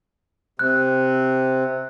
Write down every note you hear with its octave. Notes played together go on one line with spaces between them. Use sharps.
C3 F#6